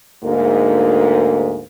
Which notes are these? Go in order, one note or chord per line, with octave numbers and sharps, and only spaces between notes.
D2 G#2 A#3